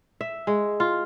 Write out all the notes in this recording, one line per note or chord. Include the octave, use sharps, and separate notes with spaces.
E5
G#3
F4